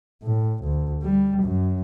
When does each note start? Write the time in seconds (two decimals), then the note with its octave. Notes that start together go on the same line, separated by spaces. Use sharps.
0.23 A2
0.64 D2
1.03 G3
1.43 F#2